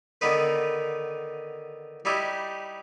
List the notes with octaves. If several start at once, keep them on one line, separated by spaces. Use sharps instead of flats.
D3 D#3 B3 D#4 B4
G3 D#4 E4 G4